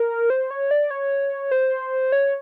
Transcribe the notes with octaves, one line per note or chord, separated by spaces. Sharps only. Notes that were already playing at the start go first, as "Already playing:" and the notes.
Already playing: A#4
C5
C#5
D5
C#5
C5
C#5